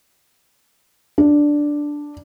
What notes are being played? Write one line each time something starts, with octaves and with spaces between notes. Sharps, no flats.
D4